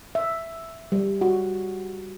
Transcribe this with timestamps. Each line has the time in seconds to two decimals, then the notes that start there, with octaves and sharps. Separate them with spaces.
0.15 E5
0.92 G3
1.21 F#4